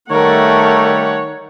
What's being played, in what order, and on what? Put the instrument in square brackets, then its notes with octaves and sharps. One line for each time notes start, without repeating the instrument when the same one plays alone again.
[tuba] D#3 [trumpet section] G3 A3 [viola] A#4 F#5 [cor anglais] C#5